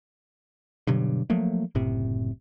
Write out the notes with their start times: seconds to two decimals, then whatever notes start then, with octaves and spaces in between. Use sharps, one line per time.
0.87 G2 B2 D3 F#3
1.30 F3 F#3 A3 A#3
1.75 F#1 A2 C3